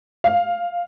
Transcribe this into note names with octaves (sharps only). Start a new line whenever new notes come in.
F5